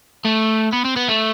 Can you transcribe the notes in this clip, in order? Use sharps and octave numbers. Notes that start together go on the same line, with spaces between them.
A3
B3
C4
B3
A3